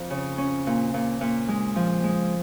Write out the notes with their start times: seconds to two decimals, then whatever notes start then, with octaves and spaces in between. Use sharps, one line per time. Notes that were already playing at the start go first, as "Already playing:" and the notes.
Already playing: F2
0.10 C#3
0.38 C#4
0.67 A#2
0.94 A#2
1.21 A#2
1.48 G#3
1.76 F3
2.04 G#3